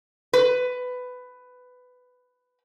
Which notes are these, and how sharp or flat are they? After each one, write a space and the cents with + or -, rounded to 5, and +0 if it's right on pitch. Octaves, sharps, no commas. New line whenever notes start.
B4 +15